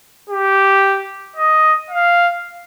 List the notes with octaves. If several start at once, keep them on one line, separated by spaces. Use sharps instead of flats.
G4
D#5
F5